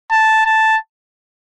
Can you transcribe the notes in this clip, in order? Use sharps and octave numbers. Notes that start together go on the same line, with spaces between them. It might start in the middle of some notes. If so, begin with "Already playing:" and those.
A5
A5